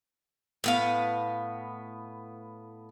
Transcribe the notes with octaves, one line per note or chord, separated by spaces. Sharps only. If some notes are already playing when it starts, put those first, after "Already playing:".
A2 B3 F5